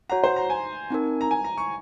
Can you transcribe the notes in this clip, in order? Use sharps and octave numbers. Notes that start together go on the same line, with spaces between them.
F#4 C#5 F#5 A#5
C5
A#5
G#5
C4 D#4 A#4
A#5
G#5
A#5
C#6